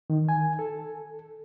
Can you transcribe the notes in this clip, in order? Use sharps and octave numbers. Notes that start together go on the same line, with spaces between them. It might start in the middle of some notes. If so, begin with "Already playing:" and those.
D#3
G#5
A4